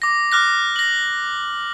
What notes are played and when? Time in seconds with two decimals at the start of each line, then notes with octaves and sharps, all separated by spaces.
0.02 D6 A#6
0.32 D6 F6 F#6 A#6
0.76 A#6 F#7